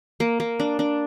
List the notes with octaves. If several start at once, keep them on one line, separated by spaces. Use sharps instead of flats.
A#3
A#3
D4
D4